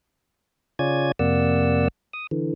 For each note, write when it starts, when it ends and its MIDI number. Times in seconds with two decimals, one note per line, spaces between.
0.79 1.12 49
0.79 1.12 65
0.79 1.12 73
0.79 1.12 74
0.79 1.12 80
0.79 1.12 92
1.19 1.88 41
1.19 1.88 48
1.19 1.88 58
1.19 1.88 74
1.19 1.88 78
1.19 1.88 88
2.13 2.27 87
2.31 2.54 50
2.31 2.54 52